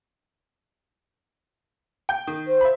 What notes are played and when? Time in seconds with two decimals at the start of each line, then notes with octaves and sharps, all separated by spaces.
2.09 G5 G6
2.27 D#3
2.48 C5
2.61 E5 B5